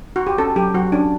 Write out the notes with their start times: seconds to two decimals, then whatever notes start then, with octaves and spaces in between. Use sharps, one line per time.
0.16 F#4
0.27 G4
0.38 C#4 A4
0.56 F#3 G4
0.75 F#3 F#4
0.92 C#4 D4